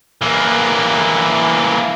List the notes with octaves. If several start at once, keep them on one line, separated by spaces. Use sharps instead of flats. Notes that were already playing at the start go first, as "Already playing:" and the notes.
E3 A#3